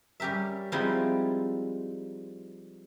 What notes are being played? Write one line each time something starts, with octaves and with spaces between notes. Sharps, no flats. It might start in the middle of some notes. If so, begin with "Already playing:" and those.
G3 C#4 G4 A#4 E5
F3 G3 G#3 C4 D#4 E4